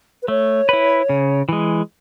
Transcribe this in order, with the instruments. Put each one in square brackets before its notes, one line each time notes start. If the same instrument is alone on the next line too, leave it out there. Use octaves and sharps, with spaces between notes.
[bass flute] B4
[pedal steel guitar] A3 [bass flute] C#5
[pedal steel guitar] E4 B4
C#3
E3 G#3